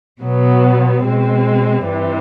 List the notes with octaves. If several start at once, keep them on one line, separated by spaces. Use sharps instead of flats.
B2 F#3 B3
B2 G#3 C4
G2 E3 G3 C4